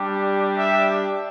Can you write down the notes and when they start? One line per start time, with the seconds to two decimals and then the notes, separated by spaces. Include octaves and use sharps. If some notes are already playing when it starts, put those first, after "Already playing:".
Already playing: G3 D4 G4
0.58 E5